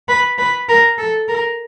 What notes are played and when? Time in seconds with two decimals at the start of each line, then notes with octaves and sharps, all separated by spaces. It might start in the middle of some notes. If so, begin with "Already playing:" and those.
0.09 B4
0.38 B4
0.69 A#4
0.98 A4
1.28 A#4